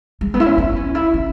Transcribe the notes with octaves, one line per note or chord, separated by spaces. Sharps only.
G#3
B3
E4
C#4
E4
C#4
E4
C#4